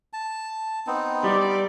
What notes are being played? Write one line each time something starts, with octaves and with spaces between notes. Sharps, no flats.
A5
B3 C4 D#4
G3 D5